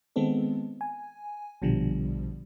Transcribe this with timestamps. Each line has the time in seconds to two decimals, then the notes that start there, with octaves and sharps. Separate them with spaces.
0.16 D#3 G#3 B3 C4 A4
0.81 G#5
1.62 A#1 B2 D3 F3 G3